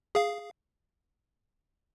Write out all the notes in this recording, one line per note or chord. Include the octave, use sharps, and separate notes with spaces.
G#4 F5